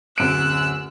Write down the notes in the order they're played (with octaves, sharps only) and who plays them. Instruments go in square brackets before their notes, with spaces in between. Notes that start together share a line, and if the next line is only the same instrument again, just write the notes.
[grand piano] D1 F#2 D7 [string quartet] E6 F#6